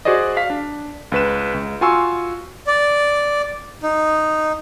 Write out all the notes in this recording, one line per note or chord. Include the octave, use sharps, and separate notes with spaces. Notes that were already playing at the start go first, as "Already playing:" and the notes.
F#4 G#4 C5 D5 D#5
F5 B6
D4
C#2 B4 E7
C#2
F4 F#4 G#5 C6 C#6 E6
D5
D#4